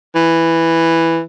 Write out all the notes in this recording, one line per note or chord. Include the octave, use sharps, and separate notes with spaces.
E3